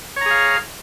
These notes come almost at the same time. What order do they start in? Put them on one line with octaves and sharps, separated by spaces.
C#5 A#5 G#4 F5